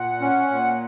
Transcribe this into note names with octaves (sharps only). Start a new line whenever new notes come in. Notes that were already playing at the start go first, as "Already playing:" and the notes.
Already playing: A#2 F#5
C#4
A#2